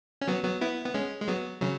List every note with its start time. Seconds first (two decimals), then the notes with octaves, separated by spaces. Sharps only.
0.21 C#4
0.28 F#3 B3
0.44 F#3 B3
0.61 B3 E4
0.86 B3
0.94 G#3 C#4
1.22 G#3
1.28 F#3 B3
1.62 C#3 F#3